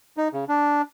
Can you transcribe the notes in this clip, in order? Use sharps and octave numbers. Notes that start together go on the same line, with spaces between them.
D#4
C#3
D4